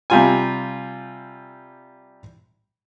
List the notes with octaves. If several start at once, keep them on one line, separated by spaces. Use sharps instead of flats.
C3 G3 F4 G#5